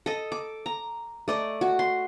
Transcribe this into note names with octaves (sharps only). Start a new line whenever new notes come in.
A4 D#5
D6
A#5
A3 D5 D#5
F#4
C6